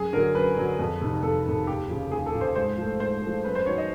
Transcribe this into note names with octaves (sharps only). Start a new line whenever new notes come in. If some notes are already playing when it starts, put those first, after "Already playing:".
Already playing: F#2 G#4
D3 F#3 A#4
F#2 B4
D3 F#3
F2
C3 D#3
F2 A4
C3 D#3
D#2 G4
C#3 F3
D#2 G#4
A4
C#3 F3
C5
G#2 C5
F3 A3
G#2 C5
F3 A3
F#2 B4
C5
D#3 F#3 C#5
D#5